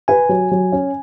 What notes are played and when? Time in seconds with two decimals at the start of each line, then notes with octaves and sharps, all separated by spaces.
0.08 B4 G#5
0.29 F#3
0.51 F#3
0.72 C#4